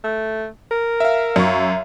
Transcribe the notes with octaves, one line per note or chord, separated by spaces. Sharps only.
A3
A#4
E5 F5
F#2 C#6